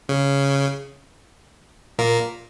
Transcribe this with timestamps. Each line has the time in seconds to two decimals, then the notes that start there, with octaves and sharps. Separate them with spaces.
0.09 C#3
1.99 A#2 A#3